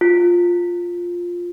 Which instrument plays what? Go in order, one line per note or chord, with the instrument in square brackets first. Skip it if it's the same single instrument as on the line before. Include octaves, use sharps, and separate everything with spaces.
[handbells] F4